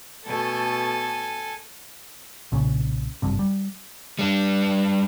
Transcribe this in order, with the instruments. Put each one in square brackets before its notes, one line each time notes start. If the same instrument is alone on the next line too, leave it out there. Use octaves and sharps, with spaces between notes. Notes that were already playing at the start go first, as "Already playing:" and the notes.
[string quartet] B2 A3 [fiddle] A4 G#5
[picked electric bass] B1 A#2 C#3
G#1 G2 C3
G3
[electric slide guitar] G3 D4